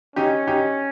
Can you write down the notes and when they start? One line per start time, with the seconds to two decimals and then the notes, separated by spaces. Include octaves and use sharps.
0.16 C#4 D#4 G4
0.47 D#4 G4